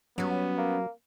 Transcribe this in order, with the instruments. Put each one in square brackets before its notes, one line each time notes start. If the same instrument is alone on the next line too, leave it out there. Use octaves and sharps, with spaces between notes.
[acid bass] F#3 [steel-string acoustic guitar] G3 C#4 [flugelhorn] B3
[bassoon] A#3